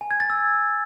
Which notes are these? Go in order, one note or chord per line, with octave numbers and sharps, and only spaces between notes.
G#5
G#6
A6
E6